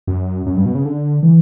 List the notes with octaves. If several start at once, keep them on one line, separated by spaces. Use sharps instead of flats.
F#2
F#2
G2
B2
C#3
D3
E3